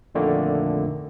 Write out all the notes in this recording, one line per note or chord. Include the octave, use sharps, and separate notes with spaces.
F2 A#2 D3 D#3 A3 A#3